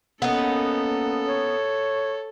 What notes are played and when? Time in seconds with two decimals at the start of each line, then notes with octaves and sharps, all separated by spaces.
0.22 A#3 B3 C#4 D#4 A4
1.28 C#5